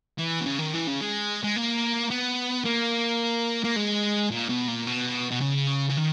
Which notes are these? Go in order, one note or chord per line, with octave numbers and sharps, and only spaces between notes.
E3
B2
C#3
D#3
E3
C#3
G#3
G#3
A#3
B3
A#3
A#3
G#3
A#2
B2
A#2
B2
B2
C#3
C#3
D#3